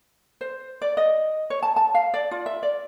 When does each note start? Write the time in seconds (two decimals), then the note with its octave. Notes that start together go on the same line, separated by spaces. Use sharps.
0.41 C5
0.82 D5
0.97 D#5
1.50 C#5
1.63 A5
1.76 A5
1.95 F5
2.14 D5
2.31 F4
2.46 E5
2.63 D5